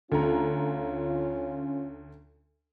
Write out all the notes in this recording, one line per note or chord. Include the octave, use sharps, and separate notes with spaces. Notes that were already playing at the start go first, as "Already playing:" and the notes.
D2 C#4 F4 A#5